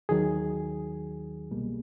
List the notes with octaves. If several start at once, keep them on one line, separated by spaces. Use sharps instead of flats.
D#2 D#3 F#3 G#4
C2 B2 G3 A#3